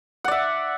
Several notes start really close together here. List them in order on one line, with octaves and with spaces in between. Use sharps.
F#5 D5 E5